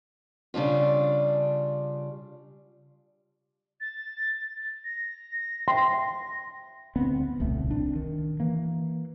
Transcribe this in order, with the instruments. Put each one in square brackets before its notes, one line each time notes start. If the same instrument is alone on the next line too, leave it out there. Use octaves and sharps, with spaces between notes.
[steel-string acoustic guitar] C#3 G3 D4 F4
[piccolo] A6
A#6
[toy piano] E5 G5 [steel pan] C6
[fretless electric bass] D2 B3 C4
D#1 C2 C#3 A3
C4 D4
D#3
E3 A#3